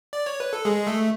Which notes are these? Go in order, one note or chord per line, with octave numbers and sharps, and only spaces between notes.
D5
C#5
B4
A4
G#3 G#4
A3 A4